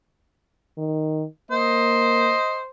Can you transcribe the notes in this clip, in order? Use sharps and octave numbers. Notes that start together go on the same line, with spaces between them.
D#3
A#3 C5 D#5